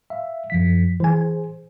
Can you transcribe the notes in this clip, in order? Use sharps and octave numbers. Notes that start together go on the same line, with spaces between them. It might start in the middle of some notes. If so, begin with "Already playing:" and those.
E5 F5
F#2 F3 B6
E3 G#4 C5 G#5